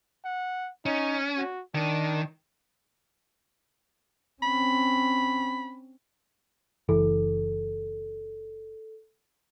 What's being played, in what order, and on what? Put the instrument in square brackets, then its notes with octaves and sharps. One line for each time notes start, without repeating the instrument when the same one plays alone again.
[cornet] F#5
[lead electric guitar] C#4 [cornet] D#4
[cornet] F#4
[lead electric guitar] D#3 [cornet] D4
[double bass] C4 C#4 [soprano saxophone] B5
[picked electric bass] F#1 E3 [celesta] A4